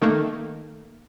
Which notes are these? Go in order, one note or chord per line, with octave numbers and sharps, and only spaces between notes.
D#3 A3 A#3